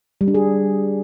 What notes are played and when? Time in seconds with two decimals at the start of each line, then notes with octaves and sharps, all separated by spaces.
0.21 G3
0.28 D4
0.34 G#4